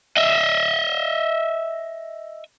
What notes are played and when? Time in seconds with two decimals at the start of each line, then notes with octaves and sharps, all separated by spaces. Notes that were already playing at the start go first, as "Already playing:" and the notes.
0.17 D#5 E5